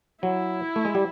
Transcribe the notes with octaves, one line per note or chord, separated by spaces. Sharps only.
F#3 E4
A3
G#3
G3